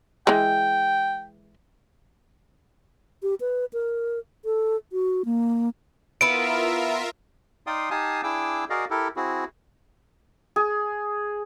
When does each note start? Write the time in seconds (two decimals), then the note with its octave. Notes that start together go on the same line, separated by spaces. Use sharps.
0.27 E3 G#3 G5
3.23 G4
3.40 B4
3.73 A#4
4.45 A4
4.92 F#4
5.25 A#3
6.21 B3 E4 F4 A#4 E5 D7
7.67 D#4 D5 F5 G5 C6 D#6
7.91 D#4 G4 F5 G#5 A5 D#6
8.23 D4 E4 G#4 G5 D6 E6
8.70 F#4 G#4 A#4 D5 D#5 F5
8.90 E4 G4 A4 A#4
9.16 C4 E4 F#4 G#4
10.56 G#4